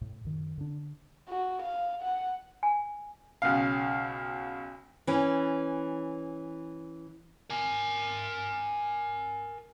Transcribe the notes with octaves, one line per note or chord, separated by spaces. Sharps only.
A2
F#2 D#3
D3 D4
F#4
F5
F#5
G#5
B1 C#3 F5
E3 C#4
A#4 G#5